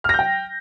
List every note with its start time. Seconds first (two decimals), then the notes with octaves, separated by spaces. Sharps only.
0.04 F6
0.09 A#6
0.14 G6
0.19 G5